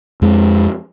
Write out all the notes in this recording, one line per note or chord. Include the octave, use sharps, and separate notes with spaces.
F2 G#3